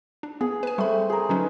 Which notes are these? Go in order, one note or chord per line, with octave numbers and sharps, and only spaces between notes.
D4
B3 G#4
B4 G#5
G3 A3 C4 B5 C#6
G#4 A#4
D3 F#3 C#4 D#4 B4